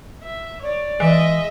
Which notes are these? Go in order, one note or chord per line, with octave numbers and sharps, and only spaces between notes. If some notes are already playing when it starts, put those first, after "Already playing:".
E5
C#5 D5
E3 G#3 D#5 E5